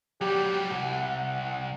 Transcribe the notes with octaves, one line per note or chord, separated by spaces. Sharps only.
F#3 G3 G4
C2 F#5